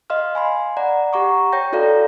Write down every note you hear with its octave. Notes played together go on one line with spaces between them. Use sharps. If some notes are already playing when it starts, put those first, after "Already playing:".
D#5 F5 C6 F6
G#5 B5 C6
D5 F#5 A#5
G4 F#5 A#5 C#6 D6
C#5 G5 G6 A#6
E4 F#4 A4 D5 F5 A#5